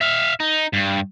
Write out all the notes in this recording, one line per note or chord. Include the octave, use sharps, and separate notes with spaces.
E5 F5
D#4
G2